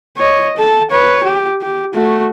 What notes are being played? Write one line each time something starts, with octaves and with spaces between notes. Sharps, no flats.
C#5 D#5
A4 A5
B4 C#5
G4
G4
A3 F#4